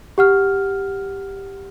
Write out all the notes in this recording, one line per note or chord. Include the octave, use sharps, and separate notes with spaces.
G4 F#5 F6